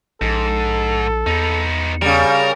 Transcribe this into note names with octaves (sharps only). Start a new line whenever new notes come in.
A#1 G#2 A4
E2 B3 D#4
C#3 G3 A#4